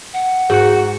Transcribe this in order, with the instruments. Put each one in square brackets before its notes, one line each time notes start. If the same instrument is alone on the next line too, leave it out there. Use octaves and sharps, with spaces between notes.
[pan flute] F#5
[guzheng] G#2 [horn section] F#4 [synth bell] G#4 C#7